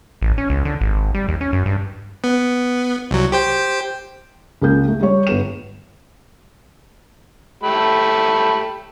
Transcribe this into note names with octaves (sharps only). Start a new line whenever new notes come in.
A1
C#4
C#2
D3
G#1
G3
D#2
C#4
F#2
G2
B3
C2 F#3
G4 C5 G5
C#2 A#3 G6
A3
G3 C#5
G1 B3 E7
A3 G4 B5